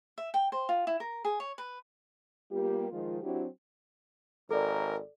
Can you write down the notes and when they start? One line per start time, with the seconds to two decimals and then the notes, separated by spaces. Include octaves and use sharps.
0.18 E5
0.34 G5
0.52 C5
0.69 F4
0.87 E4
1.00 A#4
1.25 G#4
1.40 C#5
1.58 B4
2.51 G3 A#3 B3 F4 G4
2.90 D#3 F3 G#3 F4
3.22 F#3 C4 D4 E4 F#4 G4
4.51 G#1 A4 A#4 D5